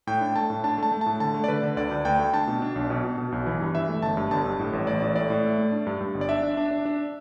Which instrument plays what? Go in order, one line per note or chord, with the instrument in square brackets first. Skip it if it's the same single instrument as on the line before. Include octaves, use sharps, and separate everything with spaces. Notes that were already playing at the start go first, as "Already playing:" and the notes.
[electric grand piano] A2 G5
D4
A3 A5
A2
D4 A5
A3 A5
A3
A5
A2
D3 A5
A3
D5
D3 B4
D3
D2 D5
D2
D2 G5
A3
D4 A5
B2
D4
B1
B2
B2
B2
B1
E3
G2
E3 E5
A3
G1 A5
G2
G1 A5
G2
A2
A1
A1 D5
A2
A3 D5
A2
A3
A3
D4
G2
G2
G1
D5
D4 E5
D4
D4
D4
D4